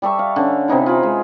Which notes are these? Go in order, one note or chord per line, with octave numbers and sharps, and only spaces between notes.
G3 A4 E5 C#6
F5
D3 C#4
C3 E3 D#4 E4
F4 G#4 B5
G#3